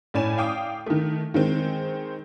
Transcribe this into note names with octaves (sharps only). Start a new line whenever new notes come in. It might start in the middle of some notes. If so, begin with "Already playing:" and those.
A2 C#4 D5 G#5 E7
F5 G5 D6 D#6
D#3 A3
D#3 G#3 C4